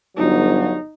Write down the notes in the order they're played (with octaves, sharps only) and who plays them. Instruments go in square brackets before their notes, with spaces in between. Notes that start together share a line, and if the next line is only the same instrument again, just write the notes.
[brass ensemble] G1 F#3 [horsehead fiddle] D#4